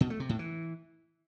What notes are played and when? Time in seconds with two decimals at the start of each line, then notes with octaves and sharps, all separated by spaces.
0.01 B2
0.10 A3
0.20 C3
0.29 A2
0.39 E3